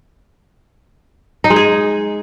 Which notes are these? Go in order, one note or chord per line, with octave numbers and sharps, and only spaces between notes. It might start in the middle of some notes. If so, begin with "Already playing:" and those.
D#4
G#3
G#4